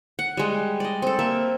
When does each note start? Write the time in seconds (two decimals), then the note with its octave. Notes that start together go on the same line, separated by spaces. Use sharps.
0.19 F#5
0.37 G3 G#3
0.80 D5 D#5
1.02 C4 A4
1.19 A#3 E5